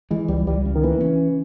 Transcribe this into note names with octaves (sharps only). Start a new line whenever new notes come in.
E3 G#3
C#2 G3
C#2 G3
C#3
D#3
E3 A#3
C#4